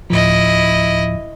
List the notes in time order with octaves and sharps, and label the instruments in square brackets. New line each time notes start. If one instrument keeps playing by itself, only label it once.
[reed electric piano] D2 A2 F3 [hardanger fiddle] E4 D#5